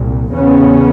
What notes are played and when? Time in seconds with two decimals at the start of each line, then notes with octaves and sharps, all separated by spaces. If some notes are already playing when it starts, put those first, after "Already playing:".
Already playing: C2 A#2
0.33 E2 C#3 B3 C#4